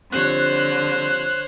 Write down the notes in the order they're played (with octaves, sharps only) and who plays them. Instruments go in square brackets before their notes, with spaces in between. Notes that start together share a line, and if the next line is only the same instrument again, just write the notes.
[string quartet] D3 [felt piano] F3 G3 C4 [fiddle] C5 C#5 [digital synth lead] F#6